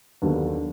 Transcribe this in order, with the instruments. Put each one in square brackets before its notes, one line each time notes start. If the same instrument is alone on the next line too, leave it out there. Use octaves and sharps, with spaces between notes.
[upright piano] D#2 D3 F#3 B3 D4